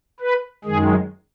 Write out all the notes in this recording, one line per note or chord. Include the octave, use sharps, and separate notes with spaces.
B4
F#2 D#3 G#3 G#4